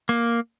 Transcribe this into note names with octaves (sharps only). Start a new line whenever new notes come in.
A#3